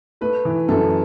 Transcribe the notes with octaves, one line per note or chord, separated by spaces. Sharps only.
A3 B4
E3
F#2 A4